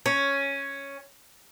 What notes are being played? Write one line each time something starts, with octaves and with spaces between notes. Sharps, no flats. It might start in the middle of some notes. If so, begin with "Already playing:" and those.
C#4